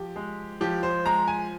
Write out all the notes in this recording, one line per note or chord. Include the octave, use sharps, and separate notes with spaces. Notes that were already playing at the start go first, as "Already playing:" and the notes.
Already playing: F3 G4
G#3
F3 G4
C5
G#3 A#5
G#5